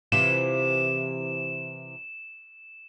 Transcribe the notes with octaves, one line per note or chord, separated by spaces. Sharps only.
C3 E3 F4 E7